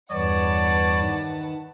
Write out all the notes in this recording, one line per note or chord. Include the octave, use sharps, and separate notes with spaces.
E2 G2 B4 C#5 D5 F#5 A5
D#3